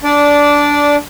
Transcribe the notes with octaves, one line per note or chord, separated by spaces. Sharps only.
D4 D5